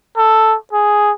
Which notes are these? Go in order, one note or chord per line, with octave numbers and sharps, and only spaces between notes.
A4
G#4